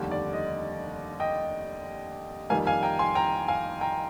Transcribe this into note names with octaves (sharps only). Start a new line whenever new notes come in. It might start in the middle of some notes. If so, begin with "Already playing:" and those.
Already playing: F1 D#2 D3 G3
D5
D#5
D#5 G5
F2 D#3 G3 A#3 F5 G#5
F5 G#5
G5 A#5
G#5 C6
G5 A#5
F5 G#5
G5 A#5